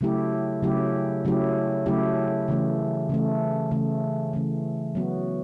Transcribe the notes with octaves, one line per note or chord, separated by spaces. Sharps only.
C#3 F#3 A3 E4 G4
C#3 F#3 A3 E4 G4
C#3 F#3 A3 E4 G4
C#3 F#3 A3 E4 G4
C#3 E3 A3
C#3 E3 A3
C#3 E3 A3
C#3 E3 A3
F#3 B3 F#4